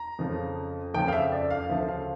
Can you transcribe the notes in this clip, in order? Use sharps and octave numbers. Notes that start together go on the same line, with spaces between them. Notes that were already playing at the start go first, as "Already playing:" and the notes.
Already playing: A#5
F2 C#3 F3
F2 C#3 F3 G5
F5
E5
D5
F5
D2 C#3 F3 E5
F5